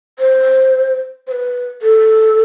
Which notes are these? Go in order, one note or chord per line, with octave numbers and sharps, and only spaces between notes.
C5
C5
B4
A4